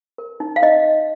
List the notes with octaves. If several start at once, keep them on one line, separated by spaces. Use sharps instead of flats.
A#4
D#4
F5
D#4 D#5